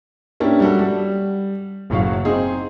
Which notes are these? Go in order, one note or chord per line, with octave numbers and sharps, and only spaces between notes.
A#3 C#4 D4 E4 G4
G3 F#4 A4
G3
F#1 A2 F#3 F#4 F5
C4 D#4 G#4